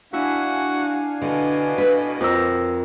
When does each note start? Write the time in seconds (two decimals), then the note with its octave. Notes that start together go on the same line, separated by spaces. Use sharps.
0.13 D4 E4 F#4 F5 G#5
1.22 B2 D3
1.78 B4
2.21 F2 A#4 E6